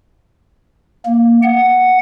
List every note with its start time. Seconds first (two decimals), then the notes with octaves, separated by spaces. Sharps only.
1.06 A#3
1.42 F#5